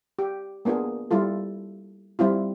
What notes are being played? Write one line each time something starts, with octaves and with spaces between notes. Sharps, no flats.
G4
A#3 B3 D4 F4 G#4
G3 E4 F4 A4
G3 C4 E4 F4